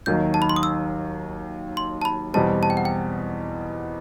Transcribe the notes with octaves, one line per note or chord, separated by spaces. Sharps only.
D#2 D#3 F#3 G6
A5
B5
C6
D#6
E6
C6
A5
B5
E2 B2 G3 C4 A5
A5
G5
F#5
G5